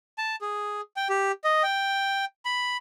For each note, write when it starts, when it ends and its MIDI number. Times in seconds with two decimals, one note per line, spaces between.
0.18 0.36 81
0.41 0.81 68
0.96 1.08 79
1.09 1.32 67
1.44 1.63 75
1.63 2.25 79
2.45 2.77 83